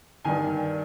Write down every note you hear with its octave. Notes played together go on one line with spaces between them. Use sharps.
G2 D#3 G#5